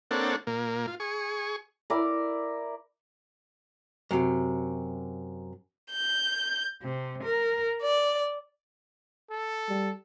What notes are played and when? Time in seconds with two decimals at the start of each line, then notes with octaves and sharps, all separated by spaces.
0.11 A#3 C4 D4 A4 C#5 F#5
0.47 A#2 A#3
0.88 F4
1.00 G#4 C#6
1.90 E4 A#4 D5
4.11 F#2 C3
5.92 G6
6.82 C3
7.23 A#4
7.82 D5
9.30 A4
9.69 G3